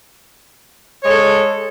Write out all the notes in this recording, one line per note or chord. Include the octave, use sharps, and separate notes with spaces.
G#3 A4 C#5